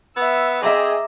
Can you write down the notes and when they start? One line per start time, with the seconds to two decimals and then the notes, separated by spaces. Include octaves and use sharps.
0.17 B3 E5 E6
0.63 C4 G#4 D#5 E5 A#5 D6